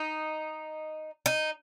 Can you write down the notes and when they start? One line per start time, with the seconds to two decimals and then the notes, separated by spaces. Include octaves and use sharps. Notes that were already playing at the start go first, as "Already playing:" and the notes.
Already playing: D#4
1.26 D#4